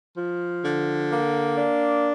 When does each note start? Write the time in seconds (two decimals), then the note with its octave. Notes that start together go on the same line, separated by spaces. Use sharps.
0.17 F3
0.64 D3
1.12 A#3
1.57 D4